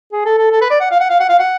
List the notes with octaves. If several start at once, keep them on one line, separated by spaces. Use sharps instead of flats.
G#4
A4
A4
A4
B4
D5
F#5
F5
F#5
F5
F#5
F5
F#5